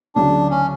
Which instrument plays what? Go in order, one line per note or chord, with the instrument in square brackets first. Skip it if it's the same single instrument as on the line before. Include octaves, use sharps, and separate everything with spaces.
[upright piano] D2 C#3 F#3 [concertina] D4
[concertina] C#4